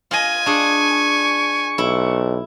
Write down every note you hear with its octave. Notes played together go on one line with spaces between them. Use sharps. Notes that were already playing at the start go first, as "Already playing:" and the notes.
F4 D#5 G#5
D4 G#4 C#6
B1 E4